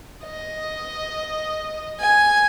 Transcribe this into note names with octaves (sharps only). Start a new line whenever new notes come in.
D#5
G#5